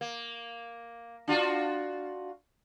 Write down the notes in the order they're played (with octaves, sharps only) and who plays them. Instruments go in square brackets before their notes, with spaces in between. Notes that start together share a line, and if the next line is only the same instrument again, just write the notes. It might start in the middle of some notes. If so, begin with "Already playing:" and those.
[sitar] A#3
D4 F4 F#4